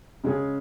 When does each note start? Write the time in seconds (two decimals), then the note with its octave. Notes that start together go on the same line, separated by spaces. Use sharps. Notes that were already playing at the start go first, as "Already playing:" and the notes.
0.24 C#3 G#3 C#4 G#4